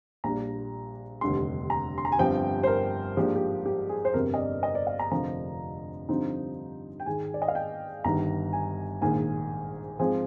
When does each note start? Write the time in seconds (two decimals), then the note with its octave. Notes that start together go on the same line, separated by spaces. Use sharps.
0.24 A#1 A#2 G3 D4 A#5
1.21 F1 D#2 D3 G3 C6
1.70 A#5
1.98 C6
2.05 A#5
2.12 G#5
2.19 G1 G2 F3 C4 G5
2.63 C5
2.67 A#4
3.17 G#2 F3 A#3 D4 G4
3.36 G4
3.66 G4
3.89 G#4
4.05 C5
4.14 G1 F2 C3 A#4
4.34 D#5
4.39 D5
4.63 D#5
4.75 D5
4.87 F5
4.99 A#5
5.11 F1 F2 D3 F3 C4 A#5
6.09 G2 D3 F3 C4 D#4
7.00 G5
7.06 G#2 D#3 G#3 G#5
7.34 D5
7.42 D#5
7.48 F5
7.55 G5
8.04 G1 G2 D#3 A#5
8.53 G#5
9.02 A#1 G#2 D#3 A#3 G#5
9.99 G#2 F3 G#3 C4 G#5